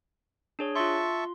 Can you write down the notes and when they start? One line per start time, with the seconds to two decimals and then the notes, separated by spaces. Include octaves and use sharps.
0.59 D4 G#4 C#5
0.76 F4 E5 A5 C6 C#6